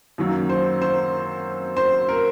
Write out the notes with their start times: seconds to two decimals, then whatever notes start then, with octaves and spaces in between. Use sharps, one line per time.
0.18 F#2 D#3 F#3 A#3
0.49 C5
0.82 C5
1.77 C5
2.09 A#4